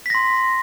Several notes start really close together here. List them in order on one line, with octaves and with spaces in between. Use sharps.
B6 A#6 C6